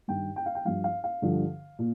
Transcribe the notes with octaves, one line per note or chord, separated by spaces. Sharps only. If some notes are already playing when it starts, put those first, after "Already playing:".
G2 D#3 G5
G5
F5
G5
G2 F3 F5
F5
F5
G2 D3 F3
A#2